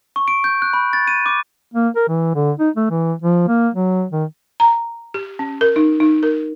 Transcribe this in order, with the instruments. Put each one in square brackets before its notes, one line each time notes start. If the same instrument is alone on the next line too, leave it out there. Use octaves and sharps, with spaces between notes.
[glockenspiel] C#6
D7
G6
F#6
B5
A6
D#7
D6
[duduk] A#3
A#4
E3
D3
D#4
A3
E3
F3
A#3
F#3
D#3
[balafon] A#5
G4
C#4
A#4
D#4
D#4
A#4